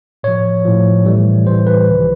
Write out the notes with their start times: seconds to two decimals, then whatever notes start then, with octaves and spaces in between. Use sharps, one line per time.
0.23 A2 F3 C#5
0.65 A2 F3
1.05 A2 E3 G3
1.46 A2 E3 G3 C5
1.67 B4
1.88 C#2 C3 D#3 F#3